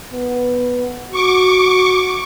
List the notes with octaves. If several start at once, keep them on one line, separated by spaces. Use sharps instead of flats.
B3
F#4 C#6 D6